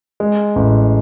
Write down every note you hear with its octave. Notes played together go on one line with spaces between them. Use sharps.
G#3
A1